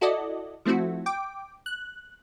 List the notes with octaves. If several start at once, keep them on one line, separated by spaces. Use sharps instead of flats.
E4 F#4 A4 D5 D#5
F3 A3 C4 E4 F#4
G5 D6
F#6